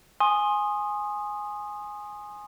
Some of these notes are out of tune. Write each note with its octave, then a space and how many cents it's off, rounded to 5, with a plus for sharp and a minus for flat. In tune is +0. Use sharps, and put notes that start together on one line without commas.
G#5 +0 C6 +25 D#6 -10